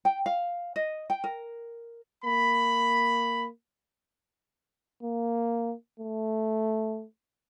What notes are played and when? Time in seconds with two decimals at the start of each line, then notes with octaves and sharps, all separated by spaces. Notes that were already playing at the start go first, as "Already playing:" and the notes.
0.05 G5
0.26 F5
0.76 D#5
1.10 G5
1.24 A#4
2.24 A#3 B5
5.03 A#3
6.00 A3